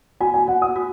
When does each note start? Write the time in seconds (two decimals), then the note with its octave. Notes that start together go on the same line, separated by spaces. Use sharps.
0.21 F#4 G#5
0.34 G#5
0.48 F#4 F#5
0.62 D#6
0.76 F#4